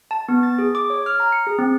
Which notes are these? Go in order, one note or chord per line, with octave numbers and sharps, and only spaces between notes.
A5
B3
A6
G#4
D6
C#5
F6
A#5
C#7
G#4
C4